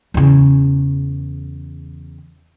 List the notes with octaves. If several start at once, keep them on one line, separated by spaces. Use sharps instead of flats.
E2 C#3